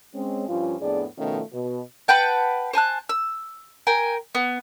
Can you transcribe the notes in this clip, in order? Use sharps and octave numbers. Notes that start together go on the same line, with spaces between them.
G#3 C4 C#4
G2 F3 C#4 F4
F2 A2 B3 D4 G#4 D5
B2 D#3 F3 A3 C#4 F4
B2
B4 F#5 G5 A5
C5 G#5 A5 F#6
E6
A#4 G5 G#5
B3